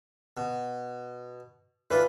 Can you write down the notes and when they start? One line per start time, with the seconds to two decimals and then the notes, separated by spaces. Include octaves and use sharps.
0.37 B2
1.91 E3 D4 F4 B4